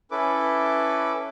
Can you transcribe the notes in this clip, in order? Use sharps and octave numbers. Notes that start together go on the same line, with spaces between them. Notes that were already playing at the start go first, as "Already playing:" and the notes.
C#4 E4 A4 B4 D6